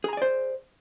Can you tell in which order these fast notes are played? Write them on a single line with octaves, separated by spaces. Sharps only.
G#4 A#5 G#5 D5 C5